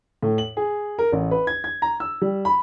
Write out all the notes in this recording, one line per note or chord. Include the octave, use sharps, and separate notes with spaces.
A2
F#7
G#4
A#4
A1
B4
G#6
G#6
A#5
E6
G3
B5